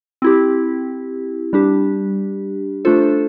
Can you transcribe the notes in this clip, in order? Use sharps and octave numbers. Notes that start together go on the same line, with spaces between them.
C4 E4 G4
G3 D4 G4
A3 D4 F4 A4 C5